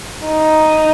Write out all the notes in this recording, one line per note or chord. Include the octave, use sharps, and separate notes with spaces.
D#4